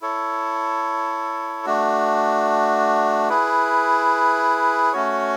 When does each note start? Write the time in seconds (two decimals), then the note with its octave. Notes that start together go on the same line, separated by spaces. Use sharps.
0.02 E4 A4 C#5
1.66 A3 D4 F#4
3.29 E4 G#4 B4
4.92 A3 C#4 F#4 C#5